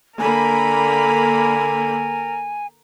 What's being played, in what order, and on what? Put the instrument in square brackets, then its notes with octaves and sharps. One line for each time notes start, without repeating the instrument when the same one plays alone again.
[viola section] D3 A#3 B5 [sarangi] A#4 [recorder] G#5